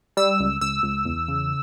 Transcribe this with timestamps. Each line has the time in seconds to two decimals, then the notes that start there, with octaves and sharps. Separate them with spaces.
0.17 G3 E6
0.40 C#2
0.61 C#2 E6
0.83 C#2
1.05 E2
1.28 C#3